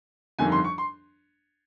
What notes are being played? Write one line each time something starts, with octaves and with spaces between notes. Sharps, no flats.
G1 F2 D#3 G3 G#5
C6
C#6
C6